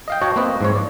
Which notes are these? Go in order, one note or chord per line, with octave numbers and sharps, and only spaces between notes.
D#5 F5 G5
F#4 C#5 D#5 F#5 G5 A5
A#3 C4 B4 D#5
G#2 F3 C#5
D5